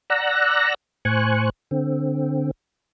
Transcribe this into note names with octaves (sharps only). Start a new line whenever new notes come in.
D5 F#5 A#5 E6 F#6 A#6
A2 C5 G#5 C#6 F#6
D3 C4